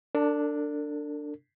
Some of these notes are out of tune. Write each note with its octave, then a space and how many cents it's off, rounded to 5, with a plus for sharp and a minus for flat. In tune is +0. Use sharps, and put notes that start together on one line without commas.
D4 +0 A4 +45